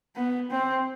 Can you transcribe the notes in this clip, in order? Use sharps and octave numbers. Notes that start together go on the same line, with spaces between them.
B3
C4